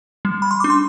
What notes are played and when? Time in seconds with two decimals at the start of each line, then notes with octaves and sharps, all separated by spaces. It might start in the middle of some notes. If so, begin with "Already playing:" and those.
0.25 G3
0.42 B5
0.51 C6
0.60 D6
0.64 D4
0.70 C6